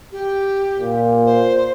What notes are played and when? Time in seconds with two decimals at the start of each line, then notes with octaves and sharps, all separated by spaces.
0.12 G4
0.79 A#2
1.26 C5